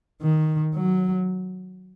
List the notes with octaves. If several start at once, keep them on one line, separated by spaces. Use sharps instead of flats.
D#3
F#3